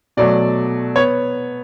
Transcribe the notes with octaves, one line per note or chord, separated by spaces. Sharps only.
B2 F#3 A3 D5
B3 C#5